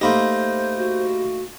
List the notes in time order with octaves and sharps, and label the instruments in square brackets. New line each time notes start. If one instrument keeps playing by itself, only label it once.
[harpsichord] A3 A#3 D#4 [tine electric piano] G4 B5 C6 [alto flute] C5
[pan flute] F#4